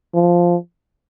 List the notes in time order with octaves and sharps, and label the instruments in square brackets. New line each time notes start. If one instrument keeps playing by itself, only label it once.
[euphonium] F3